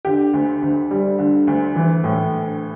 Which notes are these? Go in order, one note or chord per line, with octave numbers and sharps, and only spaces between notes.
D3 G4
D2
D2
G3
D3
D2
E3
A2